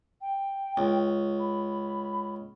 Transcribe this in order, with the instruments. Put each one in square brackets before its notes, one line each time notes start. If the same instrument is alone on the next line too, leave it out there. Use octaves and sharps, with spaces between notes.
[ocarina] G5
[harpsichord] C#2
[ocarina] B5